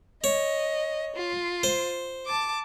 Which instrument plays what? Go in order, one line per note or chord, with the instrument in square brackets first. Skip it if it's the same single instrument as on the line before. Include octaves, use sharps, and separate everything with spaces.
[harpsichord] C#5 [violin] D#5
[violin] F4
[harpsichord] C5
[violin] A5 D6